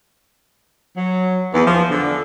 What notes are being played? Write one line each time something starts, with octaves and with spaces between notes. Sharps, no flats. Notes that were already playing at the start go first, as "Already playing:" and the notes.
F#3
E2
F3
D3